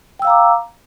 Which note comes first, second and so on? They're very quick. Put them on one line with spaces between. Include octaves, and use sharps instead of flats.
G5 E6 F5 A#5 D6